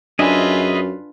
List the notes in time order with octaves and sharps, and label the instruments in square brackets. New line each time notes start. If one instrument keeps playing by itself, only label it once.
[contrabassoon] F#2 [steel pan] D4 G#5 [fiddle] F4 B4 [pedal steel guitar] G#4 D#5 E5